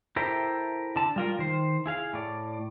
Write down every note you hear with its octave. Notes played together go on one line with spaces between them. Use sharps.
E4 G4 A4 A#4 C5 E5
D3 A5
G3 F4 A#4
D#3 C5
E4 G#4 F5
A2 D5